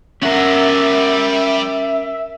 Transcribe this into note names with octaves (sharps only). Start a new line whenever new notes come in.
G3 C#4 A#4 E5 F#5